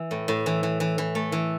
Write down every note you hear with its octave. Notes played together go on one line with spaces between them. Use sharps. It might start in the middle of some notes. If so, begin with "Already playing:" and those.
Already playing: E3
A2
A2
E3
E3
E3
E3
A3
E3